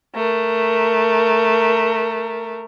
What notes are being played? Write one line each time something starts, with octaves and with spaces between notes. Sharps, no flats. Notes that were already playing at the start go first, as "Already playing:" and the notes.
A3 A#4